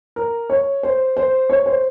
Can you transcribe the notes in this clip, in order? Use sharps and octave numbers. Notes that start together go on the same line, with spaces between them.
A#4
C#5
C5
C5
C#5
C5